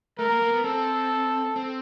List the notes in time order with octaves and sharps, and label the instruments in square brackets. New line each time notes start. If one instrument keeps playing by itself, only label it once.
[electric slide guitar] A3 [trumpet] A#4
[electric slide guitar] A#3
A#3
B3
[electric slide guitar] C4 [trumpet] A4
[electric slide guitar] C4